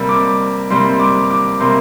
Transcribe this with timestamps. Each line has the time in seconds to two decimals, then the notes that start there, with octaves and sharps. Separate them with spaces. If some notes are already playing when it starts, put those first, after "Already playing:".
Already playing: C3 G3 A#3 E6
0.09 D6
0.70 C3 G3 A#3 C6
1.00 D6
1.31 D6
1.60 C3 G3 A#3 C6